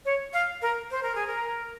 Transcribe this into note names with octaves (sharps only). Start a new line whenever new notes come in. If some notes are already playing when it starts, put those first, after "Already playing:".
C#5
F5
A#4
C5
A#4
G#4
A#4